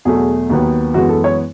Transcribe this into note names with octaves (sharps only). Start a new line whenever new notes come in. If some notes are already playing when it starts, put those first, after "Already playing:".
E2 B2 F#3 A3 G#4
D#2 D#3 F#3 B3
F#2 E3 G#3 B3 F#4
A4
C#5